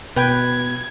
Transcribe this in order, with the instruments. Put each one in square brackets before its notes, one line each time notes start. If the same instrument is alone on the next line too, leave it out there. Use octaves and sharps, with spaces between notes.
[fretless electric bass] B2 [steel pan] B4 G5 [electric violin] G#6